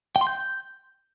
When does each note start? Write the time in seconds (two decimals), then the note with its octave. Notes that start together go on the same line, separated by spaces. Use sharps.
0.16 G5
0.21 C6
0.27 G6